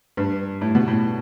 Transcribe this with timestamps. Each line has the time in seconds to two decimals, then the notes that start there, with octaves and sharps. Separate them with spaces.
0.17 G2
0.61 A2
0.75 B2
0.88 A2